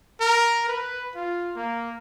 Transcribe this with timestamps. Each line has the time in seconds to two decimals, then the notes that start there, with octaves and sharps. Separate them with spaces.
0.21 A#4
0.69 B4
1.16 F4
1.56 A#3